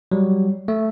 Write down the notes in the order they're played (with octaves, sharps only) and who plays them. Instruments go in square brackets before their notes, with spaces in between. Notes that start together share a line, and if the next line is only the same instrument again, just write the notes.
[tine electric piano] F#3 G3
A3